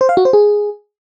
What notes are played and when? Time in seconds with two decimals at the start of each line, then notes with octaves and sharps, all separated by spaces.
0.01 C5
0.09 F5
0.17 F#4
0.25 C5
0.33 G#4